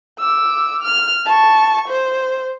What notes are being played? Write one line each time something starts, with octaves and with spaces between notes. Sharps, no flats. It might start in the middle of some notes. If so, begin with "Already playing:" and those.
D6 E6
F6
A5 C#6
C5